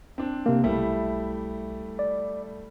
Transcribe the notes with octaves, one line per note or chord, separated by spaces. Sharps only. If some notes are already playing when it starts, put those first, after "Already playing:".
C4 D4
C3 A#3
B1 G3 A3 E4
D5